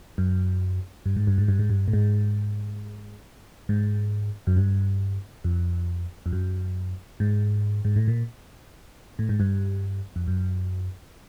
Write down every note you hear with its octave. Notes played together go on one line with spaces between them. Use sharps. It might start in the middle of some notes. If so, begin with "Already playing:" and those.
F#2
G2
G#2
G2
G#2
G2
G#2
G2
A2
G#2
G#2
F#2
G2
F2
F2
F#2
G#2
G#2
A2
A#2
A2
G#2
G2
F2
F#2